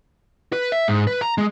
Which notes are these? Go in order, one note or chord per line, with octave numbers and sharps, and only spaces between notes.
B4
E5
G#2
B4
A#5
G#3